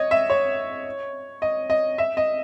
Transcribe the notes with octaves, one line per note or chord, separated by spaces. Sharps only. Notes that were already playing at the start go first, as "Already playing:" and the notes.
Already playing: C#5 D#5
E5
C#5
D#5
D#5
E5
D#5